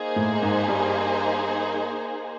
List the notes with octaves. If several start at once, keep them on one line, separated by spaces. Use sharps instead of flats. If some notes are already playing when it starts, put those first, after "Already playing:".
Already playing: A#3 D#4 G#4 C5
A2
G#2
G2